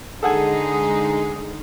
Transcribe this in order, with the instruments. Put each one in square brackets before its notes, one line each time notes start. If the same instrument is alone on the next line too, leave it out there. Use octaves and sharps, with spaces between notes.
[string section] D3 G#3 D#4 [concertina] G#4 [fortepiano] A4 F#5 G#5